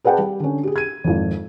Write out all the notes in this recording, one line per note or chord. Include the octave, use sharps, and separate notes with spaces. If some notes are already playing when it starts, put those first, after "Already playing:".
G#4 B4 D5 F#5 G5 A5
G3
D3 C#4
G4 G#4
G#6 D#7
G#1 F2